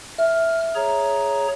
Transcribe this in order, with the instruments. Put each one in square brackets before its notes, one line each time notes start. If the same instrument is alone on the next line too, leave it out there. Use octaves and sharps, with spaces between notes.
[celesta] E5 [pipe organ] F6
[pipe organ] G#4 C#5 A#5